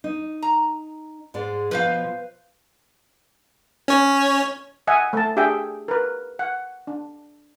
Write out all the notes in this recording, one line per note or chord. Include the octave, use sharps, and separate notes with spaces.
D#4
A#5
G#2 G#3 D5
B2 F3 B4 C5 F5
C#4 C#5
D#5 E5 F#5 G#5
A3 A5
D4 G4 G#4 E5 G5
A#4 B4
F#5
D4